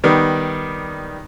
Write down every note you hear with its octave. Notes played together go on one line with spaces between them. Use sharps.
D#3 G3 B3